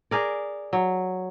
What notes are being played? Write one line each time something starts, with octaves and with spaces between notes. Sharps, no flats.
G#4 A#4 D5
F#3